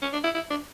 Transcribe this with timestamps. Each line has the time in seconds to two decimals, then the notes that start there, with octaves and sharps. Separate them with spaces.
0.02 C#4
0.13 D4
0.24 E4
0.34 E4
0.50 D4